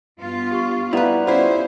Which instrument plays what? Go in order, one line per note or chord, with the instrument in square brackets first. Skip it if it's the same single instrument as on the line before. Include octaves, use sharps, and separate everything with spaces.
[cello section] G2 B3 F4
[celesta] G4 C#6
[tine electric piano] G3 B3 [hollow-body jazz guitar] E4 B4 [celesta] F5 A#5 F7
[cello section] C#4 C5 [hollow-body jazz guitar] E4 F4 [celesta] D5 F#5